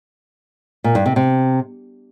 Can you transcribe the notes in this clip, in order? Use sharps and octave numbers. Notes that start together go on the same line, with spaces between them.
A#2
G2
C3
C3